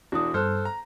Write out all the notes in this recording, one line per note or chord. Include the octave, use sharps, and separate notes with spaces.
E1 D4 E4 F#4 D#6
G2 A4 C5 F6 F#6
A#5